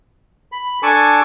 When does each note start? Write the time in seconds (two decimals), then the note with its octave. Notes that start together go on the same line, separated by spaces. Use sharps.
0.52 B5
0.83 D4 A4 G#5 A5 C#6 D6